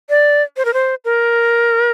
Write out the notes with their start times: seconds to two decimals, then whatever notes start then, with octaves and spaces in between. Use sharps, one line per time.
0.10 D5
0.57 C5
0.65 A#4
0.73 C5
1.05 A#4